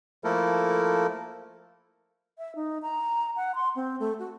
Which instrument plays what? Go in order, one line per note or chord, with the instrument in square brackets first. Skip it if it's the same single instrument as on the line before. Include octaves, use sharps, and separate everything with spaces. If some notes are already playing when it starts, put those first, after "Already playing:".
[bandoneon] F3 A3 A#3 E4 A4 A#4
[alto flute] E5
D#4
A#5
F#5
C6
C4
A3
F#4